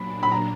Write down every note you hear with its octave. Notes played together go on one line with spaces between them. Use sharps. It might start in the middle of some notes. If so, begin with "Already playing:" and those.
Already playing: A#2 F#3 D4 B5
B5
A#5